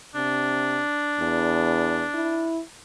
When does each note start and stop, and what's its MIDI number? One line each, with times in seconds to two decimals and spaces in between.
0.15 0.81 48
0.15 2.53 62
1.20 2.03 40
2.14 2.61 64